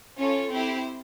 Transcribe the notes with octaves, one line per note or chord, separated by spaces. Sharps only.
C#4 F4 A4 C#5
C4 E4 G4 C5